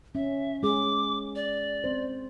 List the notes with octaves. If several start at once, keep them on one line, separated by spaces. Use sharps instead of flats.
C#4 E5
G#3 C#4 G#4 D6
D5
C4 C5